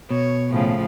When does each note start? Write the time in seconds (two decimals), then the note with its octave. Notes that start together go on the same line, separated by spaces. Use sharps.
0.11 B2 C#5
0.52 A2 C#3 F3